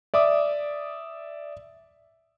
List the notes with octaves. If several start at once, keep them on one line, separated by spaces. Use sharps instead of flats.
D5 E5 D6 D#6